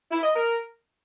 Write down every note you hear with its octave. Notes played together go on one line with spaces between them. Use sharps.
E4
D#5
A#4